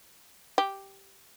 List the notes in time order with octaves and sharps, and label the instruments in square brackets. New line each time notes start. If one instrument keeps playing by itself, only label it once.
[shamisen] G4